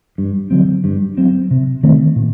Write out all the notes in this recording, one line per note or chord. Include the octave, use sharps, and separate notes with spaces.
G2
D3 F#3 C4
G2
F#3 C4
C3
D#3 A3 C4
A#2